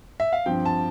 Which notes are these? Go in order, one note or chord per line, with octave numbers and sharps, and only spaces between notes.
E5
F5
G2 F3 C4 G5
A5